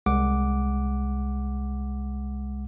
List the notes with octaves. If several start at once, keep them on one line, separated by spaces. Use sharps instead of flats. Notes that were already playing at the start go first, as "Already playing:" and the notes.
C2 G#3 F#5 D6